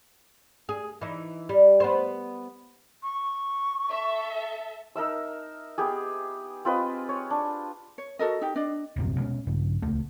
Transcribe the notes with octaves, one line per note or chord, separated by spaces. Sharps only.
G#4
E3 D#4
G3
B3 C5
C#6
A4 E5
D#4 A#4 E5 E6
B3 G4 G#4
C4 F4 B4 D#5
C#5
D4
C#5
F#4 A4 A#4 D#5
D#4 G4
D4 D5 D#5
D#1 A#1 F#2 C3
B2 G#3 C#4
A#1 G2 C#3
D#1 C#2 A3